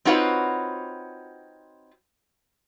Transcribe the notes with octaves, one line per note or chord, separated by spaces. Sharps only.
C4 D#4 F4 F#4 B4 C#5